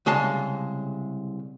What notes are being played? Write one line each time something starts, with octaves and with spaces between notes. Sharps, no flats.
C2 C#3 G#3 F5 A5